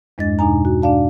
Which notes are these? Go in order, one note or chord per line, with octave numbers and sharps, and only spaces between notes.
E2 G2 G#3 D4 D#5 A6
E2 B2 D4 D#4 G#5 A#5
F#4
B2 D4 D5 F5 A5